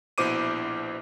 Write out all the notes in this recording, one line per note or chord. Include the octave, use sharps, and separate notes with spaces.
A#1 B2 E4 C5 D6 D#7